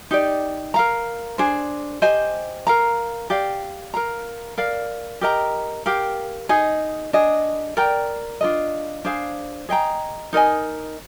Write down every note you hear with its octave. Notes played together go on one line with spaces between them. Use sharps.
D#4 G4 D5
A#4 F5 A#5
D4 G#4 C5
G4 C5 D#5 G#5
A#4 F5 A#5
G4 D5 F5
A#4 F5 A#5
A#4 D5 F5
G4 A#4 D#5 A#5
G4 A#4 F5
D#4 G#4 D#5
D4 G#4 D#5
A#4 D5 G5 A#5
D4 F4 A#4 D#5
D4 G#4 C5 F5
G#4 D#5 G5 A#5
D#4 A#4 D#5 G#5